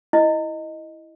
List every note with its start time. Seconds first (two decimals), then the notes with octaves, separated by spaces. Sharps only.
0.13 E4 D#5